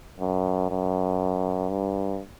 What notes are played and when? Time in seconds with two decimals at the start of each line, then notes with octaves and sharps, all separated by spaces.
0.20 F#2
0.70 F#2
1.69 G2